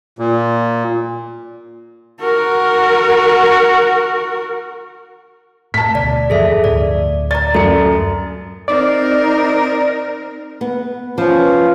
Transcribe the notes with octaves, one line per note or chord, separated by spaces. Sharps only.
A#2
F#4 A#4
A2 A5 B6
D2 B2 D5
E1 G2 F3 G#4 A4 E5
D2 A2 D5
D5 A#5 A6
F#2 A4 C#7
C4 D#4 A#4 D5
B3
F3 C#4 F4 B4